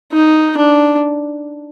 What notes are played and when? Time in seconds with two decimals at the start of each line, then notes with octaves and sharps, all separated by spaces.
0.12 D#4
0.57 D4